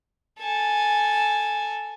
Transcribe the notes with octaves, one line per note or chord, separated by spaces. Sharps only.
A4 G#5